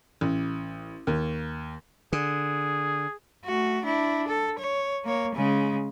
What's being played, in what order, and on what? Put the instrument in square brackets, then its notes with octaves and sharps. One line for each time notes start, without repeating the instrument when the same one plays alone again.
[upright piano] A1
D#2
[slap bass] D3 [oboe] G#4
[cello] A3 F#4
D4 E4
A4
C#5
A#3 C#5
C#3 G#3